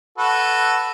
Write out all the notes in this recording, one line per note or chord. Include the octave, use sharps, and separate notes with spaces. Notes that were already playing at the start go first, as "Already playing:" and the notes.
F#4 A4 B4